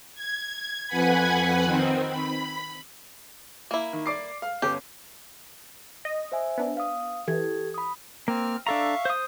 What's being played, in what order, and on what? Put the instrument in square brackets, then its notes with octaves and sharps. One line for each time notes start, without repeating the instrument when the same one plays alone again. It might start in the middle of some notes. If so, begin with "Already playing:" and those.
[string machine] G#6
F2 B4 F#5 G#5 B5 G#6
D#3 C4
B5
[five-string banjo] A#3 E4
[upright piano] D#3
D5 D6 C7
F5
[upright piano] G1 C#4 [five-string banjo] G4
[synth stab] D#5
[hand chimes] C5 E5 G#5
[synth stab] B3 D4
[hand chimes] F5 D#6
[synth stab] E3 [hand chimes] G4 A4 G#6
[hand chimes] B5 D#6
[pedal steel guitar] A#3 [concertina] C4 F6
[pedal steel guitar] D4 A4 A#5 [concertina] E5 F5 C#6
[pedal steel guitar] C5 D#6